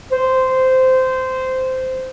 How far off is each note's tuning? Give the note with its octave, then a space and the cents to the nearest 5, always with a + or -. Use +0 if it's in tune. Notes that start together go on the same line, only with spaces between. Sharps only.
C5 -15